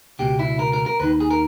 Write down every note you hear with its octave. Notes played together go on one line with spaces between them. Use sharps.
C#2 B2 G4
E4
A#4
A#4
A#4
D#2 D#3 B4
G#4
A#4